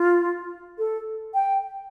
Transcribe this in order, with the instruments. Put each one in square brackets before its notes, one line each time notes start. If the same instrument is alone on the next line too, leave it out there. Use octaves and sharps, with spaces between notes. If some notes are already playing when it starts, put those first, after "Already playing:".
Already playing: [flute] F4
A4
G5